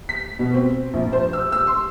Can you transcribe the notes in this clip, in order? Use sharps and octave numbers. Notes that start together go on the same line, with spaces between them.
B6
B2
C4
A#1
C5
E6
E6
C6